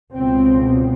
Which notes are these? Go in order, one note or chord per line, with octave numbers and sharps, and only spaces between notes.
C#2 B2 C4